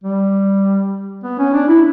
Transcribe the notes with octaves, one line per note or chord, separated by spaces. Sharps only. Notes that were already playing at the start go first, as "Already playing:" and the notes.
G3
B3
C#4
D4
E4